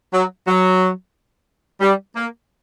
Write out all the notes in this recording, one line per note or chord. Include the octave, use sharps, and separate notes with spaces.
F#3
F#3
G3
A#3